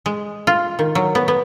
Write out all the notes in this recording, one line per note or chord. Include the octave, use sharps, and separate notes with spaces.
G#3
F4
D#3
F#3
B3
B3